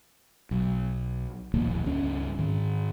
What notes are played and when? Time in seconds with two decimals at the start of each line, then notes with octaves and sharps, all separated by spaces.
0.51 B1
1.54 E1 A#1 D#2 A#3
1.86 C#2 G2 C#4
2.39 G#2 D#3